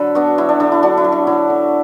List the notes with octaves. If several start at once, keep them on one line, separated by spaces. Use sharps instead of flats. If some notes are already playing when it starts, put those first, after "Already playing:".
Already playing: D3 F#3 A4 B4
B3 D4 F#4
F#3 E4
D4
D3 D4
E4
F#3 D4 F#4
E4
F#3
D4
D3 E4
D3